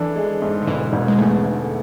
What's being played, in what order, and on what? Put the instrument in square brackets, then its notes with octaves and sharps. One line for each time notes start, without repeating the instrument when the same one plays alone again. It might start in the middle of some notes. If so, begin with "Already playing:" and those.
Already playing: [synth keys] E3 [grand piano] D4 A4
[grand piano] G#3
G#2
[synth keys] D3
[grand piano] E1 [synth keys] E3
[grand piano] E1
[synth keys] G#3
[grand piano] E2 [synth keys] A3
[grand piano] D3